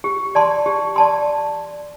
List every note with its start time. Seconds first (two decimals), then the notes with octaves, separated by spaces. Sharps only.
0.04 G4
0.35 D5 A5 C6
0.66 G4
0.96 D5 A5 C6